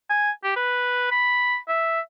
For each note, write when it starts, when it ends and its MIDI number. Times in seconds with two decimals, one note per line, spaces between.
0.10 0.31 80
0.44 0.52 67
0.56 1.07 71
1.11 1.57 83
1.68 2.00 76